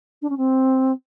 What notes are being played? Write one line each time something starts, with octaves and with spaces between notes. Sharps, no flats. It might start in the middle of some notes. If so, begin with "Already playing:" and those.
D4
C#4
C4